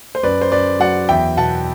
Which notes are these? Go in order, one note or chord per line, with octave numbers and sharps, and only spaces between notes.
C5
F#2 B4 D5
C5
F#2 B4 D5
F#3 D5 F#5
E2 E5 G5
B2 F#5 A5